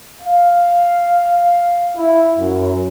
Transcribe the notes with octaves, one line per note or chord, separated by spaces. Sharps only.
F5
E4
F#2